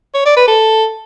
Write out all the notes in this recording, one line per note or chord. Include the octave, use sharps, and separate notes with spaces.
C#5
D5
B4
A4